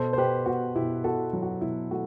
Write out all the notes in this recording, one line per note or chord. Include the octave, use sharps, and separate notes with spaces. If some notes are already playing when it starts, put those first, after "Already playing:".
Already playing: B2 A4 C5
C5
B2 G4 B4
B2 F#4
B2 E4 G4
B2 F#4 A4
F#3
F#4
B2 E4
A3 F#4